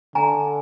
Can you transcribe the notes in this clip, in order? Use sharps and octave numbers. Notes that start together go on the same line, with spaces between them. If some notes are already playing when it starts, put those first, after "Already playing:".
D3 G#5 A#5